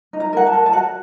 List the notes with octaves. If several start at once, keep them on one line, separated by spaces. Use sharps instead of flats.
D#4
A#5
A#4 F#5
A5
A#4
A5
F#4 F#5